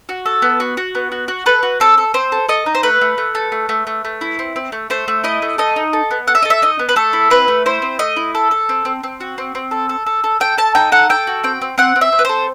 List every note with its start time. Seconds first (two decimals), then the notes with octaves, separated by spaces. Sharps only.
0.09 F#4
0.26 A4
0.42 B3
0.60 F#4
0.77 F#4
0.95 B3
1.12 F#4
1.28 F#4
1.46 A4 B4
1.63 F#4
1.80 C4 A4
1.98 A4
2.14 C4 C5
2.32 A4
2.49 A4 D#5
2.66 D#4
2.75 C5
2.83 A3 B4
3.01 A3
3.18 A3
3.35 A4
3.52 A3
3.69 A3
3.87 A3
4.05 A3
4.21 E4
4.39 C4
4.56 C4
4.72 A3
4.90 A3 C5
5.08 A3
5.24 E4 D#5
5.42 A3
5.58 A4 D#5
5.76 D#4
5.93 A4
6.11 B3
6.27 A4 F#5
6.35 E5
6.42 A4 D#5
6.50 E5
6.62 D#4 D#5
6.79 B3
6.89 B4
6.96 A3 A4
7.13 E4
7.30 C4 B4
7.48 A3
7.66 E4 C5
7.82 C4
7.99 A3 D#5
8.16 E4
8.35 A4
8.51 A4
8.69 C4
8.85 C4
9.04 C4
9.20 F#4
9.38 C4
9.55 C4
9.71 A4
9.89 A4
10.06 A4
10.24 A4
10.40 A4 G5
10.58 A4 A5
10.75 D#4 G5
10.92 A4 F#5
11.09 A4 G5
11.27 F#4
11.44 C4 G5
11.62 C4
11.78 C4 F#5
11.96 C4
12.01 E5
12.12 C4
12.19 B4
12.25 A4 C5